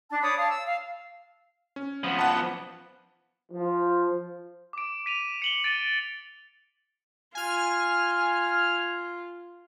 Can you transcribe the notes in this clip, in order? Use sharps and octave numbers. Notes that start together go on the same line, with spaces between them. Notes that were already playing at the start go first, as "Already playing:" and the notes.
D4 A5
C#5 D5 B5 D#6
F5 A5
E6
F5
C#4
F3 B3
F#5 A5
F3
D6 D7
B6 D#7 F7
C#7 F#7 G7
A6 D7 D#7
F4 G#5 F6